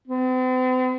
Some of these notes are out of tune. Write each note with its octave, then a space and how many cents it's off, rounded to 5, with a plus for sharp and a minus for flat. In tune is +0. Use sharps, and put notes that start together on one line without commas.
C4 -45